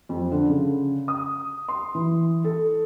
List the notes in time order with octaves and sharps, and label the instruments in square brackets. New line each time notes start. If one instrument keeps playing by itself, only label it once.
[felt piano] F2
D3
C#3
D#6
C6
E3
A4